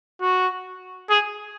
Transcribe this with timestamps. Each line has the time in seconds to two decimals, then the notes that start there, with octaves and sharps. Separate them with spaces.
0.21 F#4
1.10 G#4